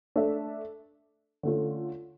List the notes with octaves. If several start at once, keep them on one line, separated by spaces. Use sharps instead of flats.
A3 D4 A4 E5
D3 A3 C#4 F4